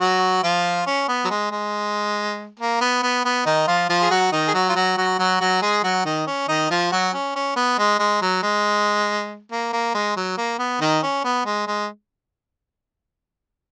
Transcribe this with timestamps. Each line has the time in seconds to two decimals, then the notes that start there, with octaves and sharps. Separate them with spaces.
0.01 F#3 F#4
0.43 F3 F4
0.87 C#4
1.08 B3
1.25 F#3
1.31 G#3
1.51 G#3
2.59 A#3
2.81 B3
3.03 B3
3.25 B3
3.46 D#3 D#4
3.67 F3 F4
3.90 F3 F4
4.02 G#4
4.10 F#3 F#4
4.32 D#3 D#4
4.48 G#4
4.54 F#3 F#4
4.69 F4
4.75 F#3 F#4
4.97 F#3 F#4
5.19 F#3 F#4
5.40 F#3 F#4
5.62 G#3 G#4
5.84 F#3 F#4
6.05 D#3 D#4
6.27 C#4
6.48 D#3 D#4
6.70 F3 F4
6.92 F#3 F#4
7.13 C#4
7.35 C#4
7.56 B3
7.78 G#3
7.99 G#3
8.22 F#3
8.43 G#3
9.52 A#3
9.72 A#3
9.94 G#3
10.17 F#3
10.38 A#3
10.59 B3
10.81 D#3 D#4
11.03 C#4
11.24 B3
11.46 G#3
11.67 G#3